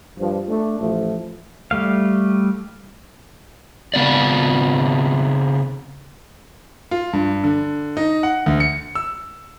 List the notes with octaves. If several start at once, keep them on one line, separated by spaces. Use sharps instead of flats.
G2 F3
A3 D4
A1 F3 A3
G3 A3 F5
C#3 B3 C4 D5
F4
G2
D3
D#4
F#5
D2
C#7
E6